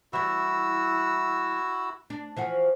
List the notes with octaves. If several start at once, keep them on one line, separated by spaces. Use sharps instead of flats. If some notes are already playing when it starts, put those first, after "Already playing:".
E3 G3 E4 F#4 E6
D4
E3 F3 F#4